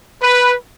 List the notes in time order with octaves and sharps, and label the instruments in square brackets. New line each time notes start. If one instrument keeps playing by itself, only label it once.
[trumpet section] B4